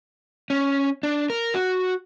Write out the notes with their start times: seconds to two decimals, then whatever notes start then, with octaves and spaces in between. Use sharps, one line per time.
0.50 C#4
1.03 D4
1.30 A#4
1.54 F#4